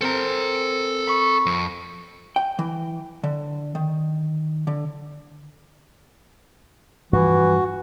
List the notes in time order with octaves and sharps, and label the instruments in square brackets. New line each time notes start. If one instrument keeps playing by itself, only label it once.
[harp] C4 A#4 [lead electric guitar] A4 A#5
[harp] D7
B5 C#6
[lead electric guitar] F2
[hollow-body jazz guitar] G5
E3
D3
D#3
D3
[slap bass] G2 F3 [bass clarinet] E3 [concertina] F#4